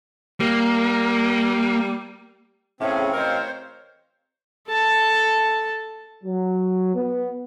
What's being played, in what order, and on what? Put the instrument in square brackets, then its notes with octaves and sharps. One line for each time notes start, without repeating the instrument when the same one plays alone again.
[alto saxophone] G3 [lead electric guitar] A#3
[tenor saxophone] A2 [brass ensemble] C#3 [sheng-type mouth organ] C4 [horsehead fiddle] C#4 G#4
[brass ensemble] A1 D#5 F5 [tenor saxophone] A#4 [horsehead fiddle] C5 C#5
[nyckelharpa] A4 A5
[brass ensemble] F#3
B3